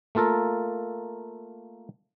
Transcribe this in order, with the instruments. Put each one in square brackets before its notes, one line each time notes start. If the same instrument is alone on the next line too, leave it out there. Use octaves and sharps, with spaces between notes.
[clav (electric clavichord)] A3 A#3 F4 A4 A#4